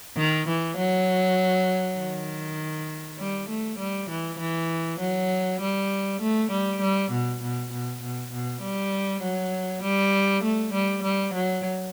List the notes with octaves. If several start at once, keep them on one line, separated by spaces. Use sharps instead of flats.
D#3
E3
F#3
D#3
G3
A3
G3
E3
E3
F#3
G3
A3
G3
G3
B2
B2
B2
B2
B2
G3
F#3
G3
A3
G3
G3
F#3